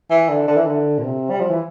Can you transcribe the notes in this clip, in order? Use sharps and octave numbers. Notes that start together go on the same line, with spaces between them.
E3
D3
D3
E3
D3
A#2
C3
G3
F3
E3